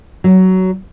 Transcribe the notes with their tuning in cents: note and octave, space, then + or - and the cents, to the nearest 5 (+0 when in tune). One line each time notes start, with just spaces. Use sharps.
F#3 +15